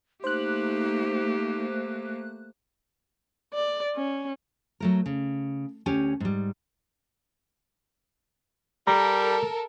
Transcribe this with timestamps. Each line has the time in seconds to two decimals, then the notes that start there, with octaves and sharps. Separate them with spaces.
0.24 A3 A#3 D#4 G4 C5 F#6
3.54 D5
3.96 C#4
4.80 F#3 A3 A#4
5.06 C#3
5.86 D2 C#4 G4 G#5
6.20 G#2 G3
8.87 G3 A4 A#4 A#5